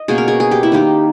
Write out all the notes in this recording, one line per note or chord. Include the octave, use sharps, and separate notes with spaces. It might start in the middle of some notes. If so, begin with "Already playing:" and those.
Already playing: D#5
B2 A#3 C#4 G#4
A#4
G#4
G#4
G4
E4
D#3 A#3 D#4 G4